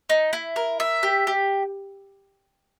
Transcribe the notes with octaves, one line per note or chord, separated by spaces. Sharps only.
D#4
E4
A#4
E5
G4
G4